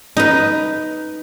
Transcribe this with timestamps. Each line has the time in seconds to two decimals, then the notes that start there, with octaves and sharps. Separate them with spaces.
0.17 D#4 B4